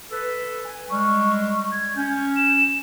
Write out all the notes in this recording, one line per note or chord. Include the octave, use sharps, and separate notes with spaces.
A4 B4
G#5
G3 G#3 C#6
G#6
C#4 G6
E7